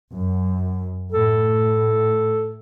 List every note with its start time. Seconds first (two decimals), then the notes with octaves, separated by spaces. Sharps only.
0.12 F#2
1.12 A2 A4